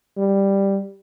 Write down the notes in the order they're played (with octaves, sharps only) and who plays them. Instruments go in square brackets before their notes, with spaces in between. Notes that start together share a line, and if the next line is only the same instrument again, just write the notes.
[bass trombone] G3